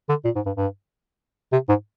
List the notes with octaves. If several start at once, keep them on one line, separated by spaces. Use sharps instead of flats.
D3
A#2
G#2
G2
G2
C3
G#2